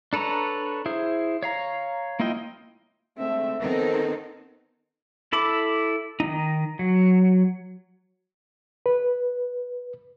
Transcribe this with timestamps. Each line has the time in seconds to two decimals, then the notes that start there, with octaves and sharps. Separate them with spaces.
0.13 D4 A4 B4 C#5 A#5
0.86 E4 G#4 C5
1.43 C#5 F5 A#5
2.20 A#3 E4 F4 D#5 G5
3.18 D3 G#3 A3 C4 E5
3.60 D#3 B3 C4 D#4 A4 A#4
5.32 E4 A4 B5 D6
6.20 D#3 D#4
6.79 F#3
8.86 B4